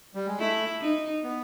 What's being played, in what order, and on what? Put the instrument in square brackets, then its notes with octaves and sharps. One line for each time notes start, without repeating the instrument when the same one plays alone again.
[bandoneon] G3
G#3
[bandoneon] A3 [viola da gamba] E4
[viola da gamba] D#4
[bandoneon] B3